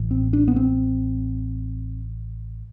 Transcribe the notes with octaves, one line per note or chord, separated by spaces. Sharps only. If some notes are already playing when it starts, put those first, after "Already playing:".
Already playing: A1 A2
C4
D4
B3
C4